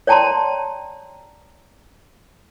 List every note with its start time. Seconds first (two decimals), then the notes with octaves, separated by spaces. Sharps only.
0.07 C#5 D5 G5 A5 A#5 C6